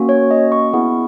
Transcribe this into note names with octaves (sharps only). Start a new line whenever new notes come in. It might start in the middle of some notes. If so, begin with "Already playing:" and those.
Already playing: A#3 C#4 F#4
C#5
D#5
C#6
B3 E4 G#4